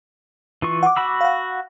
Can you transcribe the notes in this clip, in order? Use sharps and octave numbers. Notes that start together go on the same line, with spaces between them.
E3 F4 C#6
F#5 D6
F#4 B5 E6
F5 F#5